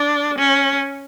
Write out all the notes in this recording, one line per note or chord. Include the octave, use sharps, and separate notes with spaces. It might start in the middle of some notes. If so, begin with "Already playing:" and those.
Already playing: D4
C#4